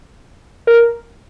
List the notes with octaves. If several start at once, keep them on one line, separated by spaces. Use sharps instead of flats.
A#4